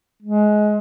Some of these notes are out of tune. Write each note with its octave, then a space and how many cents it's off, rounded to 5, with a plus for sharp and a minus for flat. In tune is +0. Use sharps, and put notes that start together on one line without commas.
G#3 +20